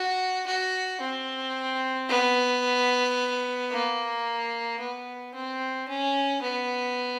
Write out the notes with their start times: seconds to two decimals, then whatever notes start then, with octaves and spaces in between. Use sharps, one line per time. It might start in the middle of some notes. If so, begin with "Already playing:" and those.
Already playing: F#4
0.47 F#4
1.01 C4
2.09 B3
3.71 A#3
4.80 B3
5.34 C4
5.88 C#4
6.42 B3